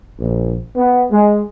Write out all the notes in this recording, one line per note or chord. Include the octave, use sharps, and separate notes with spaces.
A#1
B3
G#3